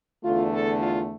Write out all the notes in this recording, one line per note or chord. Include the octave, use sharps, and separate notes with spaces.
E2 D3 A3 F4
A4
F4